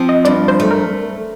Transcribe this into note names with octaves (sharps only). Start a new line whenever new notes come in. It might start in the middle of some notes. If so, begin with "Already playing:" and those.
Already playing: F3 C4
D#5
G2 D5
C5
A3
A#4